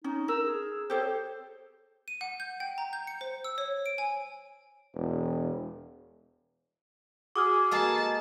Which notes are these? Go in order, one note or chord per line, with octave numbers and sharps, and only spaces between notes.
C#4 D#4
A#4 E6
G#4
G4 A4 C5 C#5
D#7
F#5
G6
G5
A#5
G6
C#7
C5
E6
C#5
D7
G#5
E1
F#4 G#4 D6 D#6 F6
G#3 A#3 A4 A5